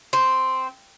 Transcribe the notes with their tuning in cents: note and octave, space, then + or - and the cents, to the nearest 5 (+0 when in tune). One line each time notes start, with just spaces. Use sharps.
C4 -5